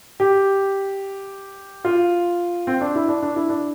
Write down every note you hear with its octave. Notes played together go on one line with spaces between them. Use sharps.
G4
F4
C4
D4
E4
D4
D4
E4
D4